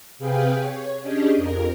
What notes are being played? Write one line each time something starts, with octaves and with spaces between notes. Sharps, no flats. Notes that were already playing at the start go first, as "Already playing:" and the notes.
C3 G#4 B4 F5 G5
C#5
C#4 D4 G4 G#4 D#5
F2 A#4